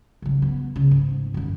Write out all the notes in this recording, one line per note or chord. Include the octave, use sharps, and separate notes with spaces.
C#3 F#3
B3
C#3
G#2
F#2 D3